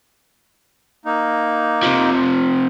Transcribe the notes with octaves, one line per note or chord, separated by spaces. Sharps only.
A#3 D#4
C3 F3